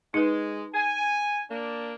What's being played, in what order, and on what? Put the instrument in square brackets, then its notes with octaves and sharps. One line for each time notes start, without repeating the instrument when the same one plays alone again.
[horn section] G#3 [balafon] D#4 B4
[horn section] G#5
A#3 D4